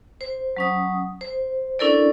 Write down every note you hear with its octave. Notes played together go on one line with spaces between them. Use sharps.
C5
F#3 C#4 D#6
C5
C#4 D4 E4 A4 A#4 D5